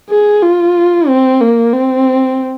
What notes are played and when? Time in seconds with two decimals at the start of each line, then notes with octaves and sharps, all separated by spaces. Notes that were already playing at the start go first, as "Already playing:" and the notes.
0.10 G#4
0.43 F4
1.08 C4
1.41 A#3
1.73 C4